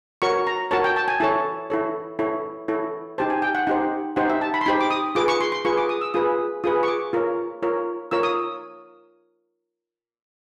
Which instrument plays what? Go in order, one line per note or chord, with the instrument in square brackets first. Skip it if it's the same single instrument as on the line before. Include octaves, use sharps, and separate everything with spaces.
[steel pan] F#4 A#4 C#5 C#6
A#5
F#4 A#4 C#5 A5
G5
A5
G#5
E4 A4 C#5 A5
E4 A4 C#5
E4 A4 C#5
E4 A4 C#5
D#4 G4 C5 A5
G#5
G5
F#5
D#4 G4 C5 F#5
D#4 G4 C5 F#5
E5
A5
B5
C6
D#4 G4 C5 B5
D6
D#6
F4 G#4 B4 D6
C#6
C6
C6
F4 G#4 B4 C#6
D6
D#6
E6
F4 G#4 B4 D#6
F4 G#4 B4 D#6
C#6
D6
F4 A#4 C#5
F4 A#4 C#5
F4 A#4 C#5 E6
D#6